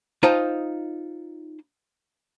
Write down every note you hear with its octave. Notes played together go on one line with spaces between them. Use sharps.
D#4 F4 C5 D#5 G5 A5